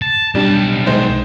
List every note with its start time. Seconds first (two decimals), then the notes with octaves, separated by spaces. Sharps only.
0.02 A5
0.35 B1 G3 D4 A5
0.85 D#3 G#3 C5